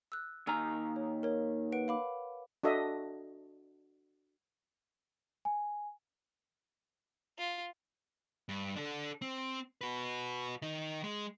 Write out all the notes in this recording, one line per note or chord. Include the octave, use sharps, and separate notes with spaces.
E6 F#6
D#2 D#3 G#5 A#5 E6 F6
C#5
A#4 C#5
B4 F#5 D7
F5 B5 D6
D4 F#4 A4 D#5 E5
G#5
F4
G2
D4 A4
C4
F#4 B4
D#3 D#4
G#3